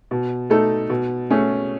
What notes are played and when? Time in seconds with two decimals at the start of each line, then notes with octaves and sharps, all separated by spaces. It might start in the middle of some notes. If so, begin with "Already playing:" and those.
0.11 B2
0.50 A3 D#4 A4
0.90 B2
1.30 A3 C#4 G#4